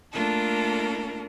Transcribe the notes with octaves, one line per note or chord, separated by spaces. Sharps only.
A3 A#3 D4 F4 A4 A#4